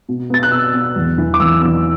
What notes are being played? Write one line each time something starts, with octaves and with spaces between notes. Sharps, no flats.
B2
B3 A6
F#6
B2 E6
B3
E2
E3 B3
D6
E2 E6
E3 B3 E6